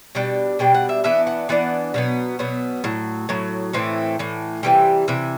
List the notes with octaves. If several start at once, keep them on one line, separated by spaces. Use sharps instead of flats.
B2 G3 D4 G5
B2 G3 D4 G5
F#5
E5
E3 B3 D4 E5
F#5
E3 B3 D4 F#5
B2 F#3 B3
B2 F#3 B3
A2 F#3
A2 F#3
A2 E3 A3 C4
A2 E3
C3 E3 G3 G5
C3 E3 E5